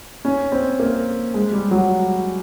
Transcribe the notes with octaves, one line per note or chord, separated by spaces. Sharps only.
C#4
C4
A#3
G#3
G3
F#3